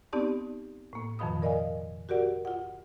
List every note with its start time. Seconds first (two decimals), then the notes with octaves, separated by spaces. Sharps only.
0.13 B3 C4 D#4 G4 D5 A5
0.93 A2 A#3
1.19 F2 B2 D#3 F3 B5 D#6
1.42 A#4 D5 D#5 F5 G#5
2.09 F#4 G4 A#4 D5 F#5
2.45 F4 F#5